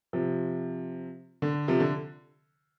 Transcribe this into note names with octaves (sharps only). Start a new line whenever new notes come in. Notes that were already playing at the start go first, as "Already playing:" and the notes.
C3 F3
D3
C3 F3
D3